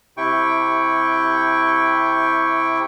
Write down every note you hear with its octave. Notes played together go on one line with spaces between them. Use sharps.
C3 E4 G5 C#6